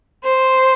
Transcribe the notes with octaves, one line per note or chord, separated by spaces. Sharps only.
C5